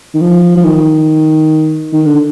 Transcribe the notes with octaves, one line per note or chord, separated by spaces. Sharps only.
D#3
F3
F3
D#3
D#3
D3